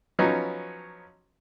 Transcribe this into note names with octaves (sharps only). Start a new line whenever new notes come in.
F3 F#3 B3 C#4 D#4